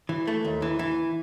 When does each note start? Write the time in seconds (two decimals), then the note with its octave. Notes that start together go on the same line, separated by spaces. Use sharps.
0.09 E3
0.27 A3
0.45 D#2
0.62 E3
0.79 E3